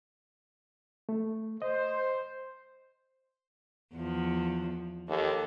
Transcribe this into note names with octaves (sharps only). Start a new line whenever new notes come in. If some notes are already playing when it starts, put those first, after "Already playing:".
A3
C5 D#5
E2 F3
D#2 A4